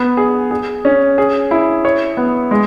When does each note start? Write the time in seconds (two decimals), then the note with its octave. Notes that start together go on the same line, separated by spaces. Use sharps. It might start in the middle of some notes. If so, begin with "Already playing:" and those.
Already playing: B3
0.17 G#4
0.51 G#4
0.85 C#4
1.18 G#4
1.51 E4
1.85 C#5
2.17 B3
2.51 G#3